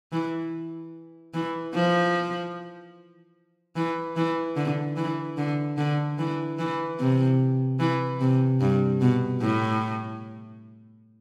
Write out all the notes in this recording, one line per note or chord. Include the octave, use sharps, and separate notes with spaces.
E3
E3
F3
E3
E3
D3
E3
D3
D3
E3
E3
C3
E3
C3
G2
B2
A2